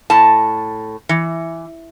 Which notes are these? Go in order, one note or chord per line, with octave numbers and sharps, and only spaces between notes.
A2 A5
E3